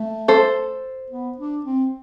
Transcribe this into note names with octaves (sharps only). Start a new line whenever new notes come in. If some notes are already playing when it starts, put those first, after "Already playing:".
Already playing: A3
A4 C5
B3
D4
C4